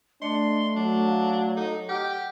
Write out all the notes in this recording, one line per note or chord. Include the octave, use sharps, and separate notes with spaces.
A3 D4 D#5 C6 C#7
F#3 D4
F5
D#4 A4 D#5
G4 F#5 F6